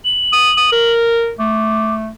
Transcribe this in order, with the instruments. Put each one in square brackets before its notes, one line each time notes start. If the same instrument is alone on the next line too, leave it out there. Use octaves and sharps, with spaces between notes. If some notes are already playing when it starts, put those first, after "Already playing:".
[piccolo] F#7
[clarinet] D#6
D#6
A#4
[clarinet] A3 [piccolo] D6